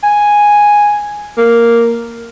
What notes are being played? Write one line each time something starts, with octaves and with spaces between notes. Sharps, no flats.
G#5
A#3